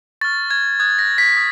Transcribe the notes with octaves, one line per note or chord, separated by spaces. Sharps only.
C#6 F6 A6
G#6
D#6 F#6 G#6
A#6
B6
D#6